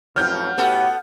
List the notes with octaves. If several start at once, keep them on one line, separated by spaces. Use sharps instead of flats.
A1 F2 F#3 F6 G6
A2 B3 F#4 G4 A4 F#5